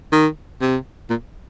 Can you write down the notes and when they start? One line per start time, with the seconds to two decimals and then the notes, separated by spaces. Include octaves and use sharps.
0.12 D#3
0.61 C3
1.10 A#2